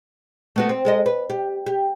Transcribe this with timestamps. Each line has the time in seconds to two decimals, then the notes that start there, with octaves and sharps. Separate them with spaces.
0.56 A3 B3 F#4
0.69 C4
0.85 G#3 A4 D#5
1.06 B4
1.30 G4
1.66 G4